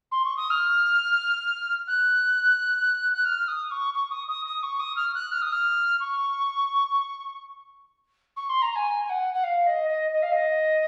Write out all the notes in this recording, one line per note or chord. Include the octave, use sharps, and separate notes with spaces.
C6
C#6
D#6
F6
F#6
F#6
F6
D#6
C#6
C#6
D#6
D#6
D#6
C#6
D#6
F6
F#6
F6
D#6
F6
C#6
C#6
C6
A#5
G#5
G#5
F#5
F#5
F5
D#5
D#5
D#5
F5
D#5